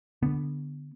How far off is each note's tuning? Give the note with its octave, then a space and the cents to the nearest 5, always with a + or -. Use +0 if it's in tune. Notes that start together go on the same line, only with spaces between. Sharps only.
D3 +0 B3 +0